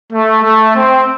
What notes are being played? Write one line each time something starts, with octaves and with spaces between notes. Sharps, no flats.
A3
A3
C4